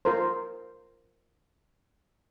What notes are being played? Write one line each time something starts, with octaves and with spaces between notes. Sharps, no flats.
F4 A#4 C5